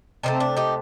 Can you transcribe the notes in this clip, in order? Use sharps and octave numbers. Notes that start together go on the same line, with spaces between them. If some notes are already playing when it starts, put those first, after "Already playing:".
C3 D#3 A3 C4 D#4
D4
D#4 G4